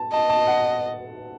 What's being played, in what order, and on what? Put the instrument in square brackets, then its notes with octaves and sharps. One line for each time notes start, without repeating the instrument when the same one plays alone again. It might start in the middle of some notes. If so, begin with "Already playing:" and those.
Already playing: [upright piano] A5
[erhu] D#5 [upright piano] A5
[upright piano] A5
F#5